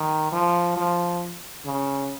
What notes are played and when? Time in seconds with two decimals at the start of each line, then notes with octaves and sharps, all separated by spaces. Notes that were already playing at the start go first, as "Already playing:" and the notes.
Already playing: D#3
0.32 F3
0.77 F3
1.65 C#3